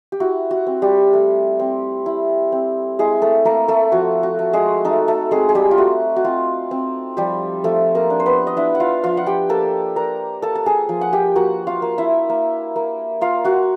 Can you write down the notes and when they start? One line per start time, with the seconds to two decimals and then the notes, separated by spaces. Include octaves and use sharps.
0.12 G4
0.20 E4 F#4
0.51 F#4
0.67 C4
0.82 G3 G4
1.13 A3
1.59 C4
2.06 E4
2.52 C4
2.99 G#3 E4 G#4
3.22 A3 A4
3.45 A3 A#3 A#4
3.68 A3 A4
3.92 F3 F#4
4.23 F#4
4.39 A3
4.53 G#3 G#4
4.85 A3 D#4 A4
5.08 A3 A4
5.31 G#3 C4 G#4
5.49 G#4
5.55 G3 G4
5.71 F4
5.78 A3 F#4
6.16 F#4
6.24 C4 F4
6.71 C4
7.17 F3 G3 G4
7.64 F3 A3 A4
7.95 A#3 A#4
8.10 D4
8.20 C5
8.26 B3 B4
8.47 D#5
8.57 D4 E4 E5
8.75 F#5
8.80 F4 F5
9.03 F3 F4 F5
9.17 F#5
9.27 G4 G5
9.49 A#3 A4 A5
9.96 D4 A#4 A#5
10.42 A#3 A4 A5
10.55 A5
10.66 G#4 G#5
10.89 F3
11.01 F#5
11.13 G4 G5
11.36 A#3 F#4 F#5
11.67 F4 F5
11.82 A#3
11.98 E4 E5
12.29 A#3
12.76 A#3
13.21 A#3 F4 F5
13.44 F#4 F#5